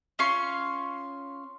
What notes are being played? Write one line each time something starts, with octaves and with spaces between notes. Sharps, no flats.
C#4 F4 C6 C#6